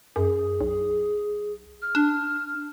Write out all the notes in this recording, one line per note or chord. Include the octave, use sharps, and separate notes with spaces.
F#2 G#4
B1
F6
D4